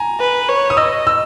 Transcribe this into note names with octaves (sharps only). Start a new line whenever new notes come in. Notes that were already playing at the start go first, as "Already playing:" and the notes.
Already playing: G#5 A#5
B4
C#5
D#6
D#5 E6
E6